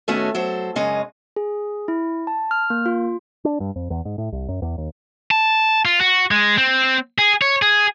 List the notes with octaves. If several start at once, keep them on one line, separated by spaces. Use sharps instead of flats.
A2 D#3 A3 B3 C#4 F#4
F#3 A4 C5
F#2 C#3 G#3 C#4 D#5
G#4
E4
A5
F6
A#3
F4
D4
G2
F2
E2
G#2
A2
C2
F#2
E2
D#2
A5
F4
F#4
G#3
C4
G#4
C#5
G#4